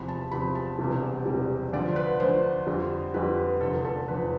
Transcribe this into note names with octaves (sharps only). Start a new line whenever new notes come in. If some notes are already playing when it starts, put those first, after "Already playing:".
Already playing: E2 C3 F3 B5
A5
E2 C3 F3 B5
A5
E1 E2 C3 G3
E1 E2 C3 G3
D2 D3 F3 D5
B4
D2 D3 F3 C5
F2 D3 G3
F2 D3 G3 B4
B4
F1 E2 D3 F3 A4
A4
F1 E2 D3 F3 B4